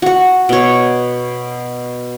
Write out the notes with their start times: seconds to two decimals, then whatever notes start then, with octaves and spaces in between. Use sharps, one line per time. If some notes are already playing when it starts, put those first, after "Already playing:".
0.02 F#4 F#5
0.49 B2 C#5